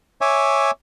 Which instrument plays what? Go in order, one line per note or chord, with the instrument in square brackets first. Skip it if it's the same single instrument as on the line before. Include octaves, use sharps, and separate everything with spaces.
[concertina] C#5 E5 G#5 D6